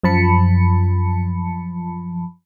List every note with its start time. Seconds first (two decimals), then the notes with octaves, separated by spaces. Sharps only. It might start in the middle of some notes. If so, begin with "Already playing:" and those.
0.03 F#2 F3 A5 B5 C#7